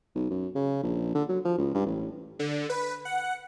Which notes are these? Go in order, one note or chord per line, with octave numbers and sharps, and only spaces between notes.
B1
F#2
C#3
A#1
D3
F#3
F3
C#2
G2
A1
D3
B4
F#5